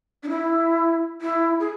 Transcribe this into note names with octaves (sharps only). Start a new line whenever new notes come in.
D4
E4
E4
G#4